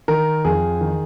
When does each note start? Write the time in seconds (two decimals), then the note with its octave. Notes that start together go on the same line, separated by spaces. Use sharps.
0.08 D#3 A#4
0.44 F2 G#4
0.81 D#3